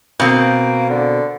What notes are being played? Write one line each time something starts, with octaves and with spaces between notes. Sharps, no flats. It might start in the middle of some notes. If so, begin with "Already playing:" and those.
B2 A#3 C4
D3